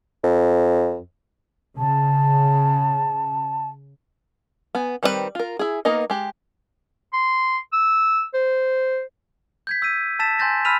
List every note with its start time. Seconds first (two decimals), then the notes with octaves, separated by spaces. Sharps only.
0.24 F2
1.77 C#3 A5
4.75 B3 G#5
5.03 D#3 G3 C4 F4 B4
5.35 F4 A#4
5.59 E4 G#4
5.85 A#3 B3 D#4 A#4 D#5
6.10 G#3 G4
7.13 C6
7.73 E6
8.34 C5
9.67 G6 G#6 B6
9.82 E6 G6 B6 D#7
10.19 A5 E6 A6 B6 E7
10.39 G#5 C6 G6 A6 A#6
10.65 B5 E6 F6 B6 D#7 F7